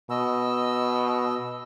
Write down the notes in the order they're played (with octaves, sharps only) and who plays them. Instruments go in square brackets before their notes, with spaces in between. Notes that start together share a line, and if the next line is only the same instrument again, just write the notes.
[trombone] B2 [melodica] D#5 E6